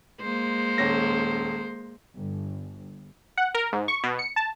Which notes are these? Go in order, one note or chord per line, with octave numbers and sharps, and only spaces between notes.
G#3 A#3 C5
D#1 C#4 A#6
G1
F#5
A#4
G#2
C#6
B2
C#7
A5